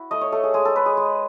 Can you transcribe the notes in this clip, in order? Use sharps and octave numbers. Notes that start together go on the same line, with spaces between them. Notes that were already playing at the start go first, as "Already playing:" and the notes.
Already playing: E4 F#4
A3 D#5
C#5
A3 A4
G#4
G#3 G#4
A4
G#3 B4
G#4
G#3